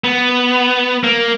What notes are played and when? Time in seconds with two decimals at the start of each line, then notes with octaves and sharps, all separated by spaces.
0.04 B3
1.04 A#3